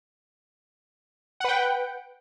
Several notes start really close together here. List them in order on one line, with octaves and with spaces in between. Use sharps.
F#5 B4 G5